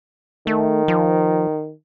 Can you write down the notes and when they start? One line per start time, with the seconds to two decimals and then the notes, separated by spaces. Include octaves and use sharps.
0.47 D#3 A3
0.88 F3